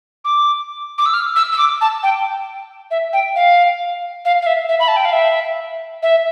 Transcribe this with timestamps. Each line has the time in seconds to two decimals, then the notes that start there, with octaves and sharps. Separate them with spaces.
0.25 D6
0.98 D6
1.06 E6
1.13 F6
1.36 E6
1.52 E6
1.58 D6
1.81 A5
2.03 G5
2.91 E5
3.13 G5
3.36 F5
4.25 F5
4.42 F5
4.46 E5
4.69 E5
4.80 B5
4.88 A5
4.96 G5
5.05 F5
5.13 E5
6.03 E5